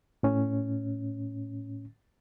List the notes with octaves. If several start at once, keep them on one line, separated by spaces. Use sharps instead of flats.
A2 C#4